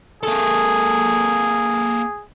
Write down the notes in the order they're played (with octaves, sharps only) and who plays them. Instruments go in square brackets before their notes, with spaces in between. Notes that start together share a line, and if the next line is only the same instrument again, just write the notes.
[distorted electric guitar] A#3 A4 [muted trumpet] G#4